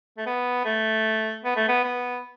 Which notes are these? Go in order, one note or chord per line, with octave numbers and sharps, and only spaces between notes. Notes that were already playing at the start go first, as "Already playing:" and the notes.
A3
B3
A3
B3
A3
B3
B3